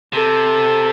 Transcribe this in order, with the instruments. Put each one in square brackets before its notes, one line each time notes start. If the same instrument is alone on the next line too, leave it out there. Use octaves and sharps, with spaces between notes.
[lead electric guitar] C3 [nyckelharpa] A4